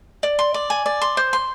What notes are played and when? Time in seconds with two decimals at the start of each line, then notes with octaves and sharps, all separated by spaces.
0.23 D5
0.39 C6
0.54 D5
0.70 G#5
0.86 D5
1.01 C6
1.17 C5
1.33 C6